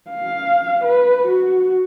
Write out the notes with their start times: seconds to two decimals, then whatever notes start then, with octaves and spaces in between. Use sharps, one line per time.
0.10 F5
0.84 B4
1.27 F#4